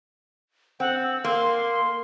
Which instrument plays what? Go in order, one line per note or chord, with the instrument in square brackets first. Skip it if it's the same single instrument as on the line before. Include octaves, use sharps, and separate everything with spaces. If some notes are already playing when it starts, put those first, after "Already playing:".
[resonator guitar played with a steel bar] C4 [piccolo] F#5
[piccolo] E6
[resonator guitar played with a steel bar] A#3 [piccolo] C6